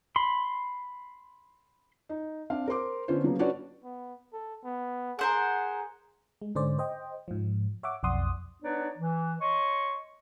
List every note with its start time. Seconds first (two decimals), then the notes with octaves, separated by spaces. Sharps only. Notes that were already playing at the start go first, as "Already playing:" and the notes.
0.16 B5 C6
2.09 D#4
2.50 C4 D4 F5
2.68 A#4 C5 C6 D6
3.08 D3 B3 C#4 F4 B4 C5
3.24 C#3 F3 F#3 A#3 B3
3.39 C#4 D4 F#4 B4 C#5 D5
3.84 B3
4.33 A4
4.65 B3
5.19 G#4 A#4 C5 F#5
6.42 G#3
6.55 G#2 D3 C#4 C5 D5
6.78 C5 D#5 G5
7.28 G#2 F3
7.83 C#5 E5 F#5 D6
8.03 B1 F2 D5 F#5 C6 D#6
8.63 B3 D4 D#4 B4 C#5 D5
8.98 E3
9.41 C#5 D#5 C6 C#6